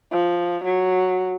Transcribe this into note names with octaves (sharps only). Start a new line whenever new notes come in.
F3
F#3